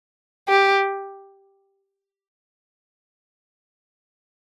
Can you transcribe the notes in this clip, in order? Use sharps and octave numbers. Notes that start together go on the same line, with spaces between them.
G4